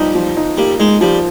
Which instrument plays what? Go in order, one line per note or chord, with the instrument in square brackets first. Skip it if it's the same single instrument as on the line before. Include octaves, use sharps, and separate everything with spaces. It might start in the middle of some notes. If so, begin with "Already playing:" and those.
Already playing: [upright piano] F3 D#4 [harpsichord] G3
[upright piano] F3
D#4
[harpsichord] G3 [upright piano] A#3
[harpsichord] G#3 [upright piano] D#4
[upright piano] F3 [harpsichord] G3